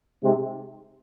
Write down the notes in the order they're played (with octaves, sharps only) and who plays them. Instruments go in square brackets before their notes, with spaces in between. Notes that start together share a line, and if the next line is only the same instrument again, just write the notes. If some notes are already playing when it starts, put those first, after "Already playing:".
[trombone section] G#2 C3